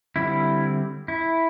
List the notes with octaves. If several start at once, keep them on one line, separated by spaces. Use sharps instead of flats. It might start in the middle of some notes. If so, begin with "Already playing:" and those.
D3 G3 C4 E4
E4